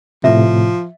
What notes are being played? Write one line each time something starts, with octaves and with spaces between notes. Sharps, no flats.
A2 C3 F3 E5